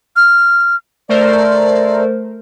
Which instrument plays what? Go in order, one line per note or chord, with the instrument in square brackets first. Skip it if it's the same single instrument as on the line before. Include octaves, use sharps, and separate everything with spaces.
[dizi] F6
[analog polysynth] A3 A#4 C5 [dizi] D5